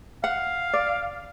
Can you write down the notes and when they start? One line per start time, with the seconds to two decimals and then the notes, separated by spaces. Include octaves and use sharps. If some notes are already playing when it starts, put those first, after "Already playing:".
0.24 F5 F#5
0.73 D5